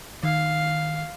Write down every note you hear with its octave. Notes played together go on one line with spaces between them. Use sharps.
D#3 F5